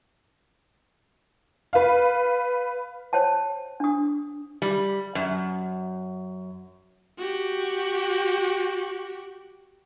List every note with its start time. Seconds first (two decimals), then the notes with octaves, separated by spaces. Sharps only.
1.73 B4 F5
3.13 C5 C#5 G5 A5
3.80 D4 D#6
4.62 G3
5.15 F#2
7.18 F#4 G4